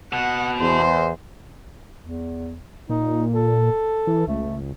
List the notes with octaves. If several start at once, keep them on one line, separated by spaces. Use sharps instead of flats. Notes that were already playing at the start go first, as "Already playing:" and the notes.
B2 F#5
E2 C5
E2
A#2 D#4
A4
E3
C#2 A3